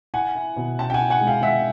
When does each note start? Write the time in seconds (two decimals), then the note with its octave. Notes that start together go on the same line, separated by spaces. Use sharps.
0.14 E4 F#5 G#5
0.35 E4
0.57 B2
0.79 C#4 G5 A5
0.90 G5
0.94 F#5 G#5
1.01 E4
1.10 F#5 G#5
1.21 G#3
1.27 F5 G5
1.42 G#3 E5 F#5